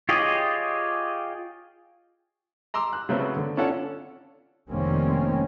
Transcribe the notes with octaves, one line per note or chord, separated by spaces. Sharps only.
F4 G4 G#4 C#5 D#5
A#5 C6 D6 E6
F#6
C#3 F#3 A3 B3 C4
D3
C#4 D4 F4 A4 C#5 F#5
F1 D#3 G3 A#3 C4 C#4